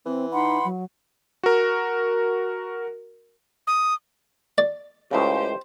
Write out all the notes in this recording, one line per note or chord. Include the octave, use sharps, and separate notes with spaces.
E3 C4
D#4 F#5 B5 C6
F#3
F#4 A#4
D#6
D5
C#2 A2 C#3 G4 C5